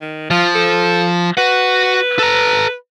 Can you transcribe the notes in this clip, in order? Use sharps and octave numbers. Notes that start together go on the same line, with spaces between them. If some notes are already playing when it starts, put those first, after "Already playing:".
D#3
F3 F4
A4
F#4 B4 F#5
A4 A#5